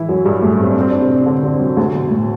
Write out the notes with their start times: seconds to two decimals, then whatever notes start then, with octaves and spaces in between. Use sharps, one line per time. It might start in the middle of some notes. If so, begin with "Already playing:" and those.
Already playing: E3 E4
0.09 F#2 F#3
0.25 G2 G3
0.42 A2 A3
0.59 C4
0.70 D4
0.80 C4
0.91 D4
1.02 C3 C4
1.26 D3 D4
1.43 C3 C4
1.60 F#2 F#3
1.77 D2 D3
1.93 B2
2.10 A2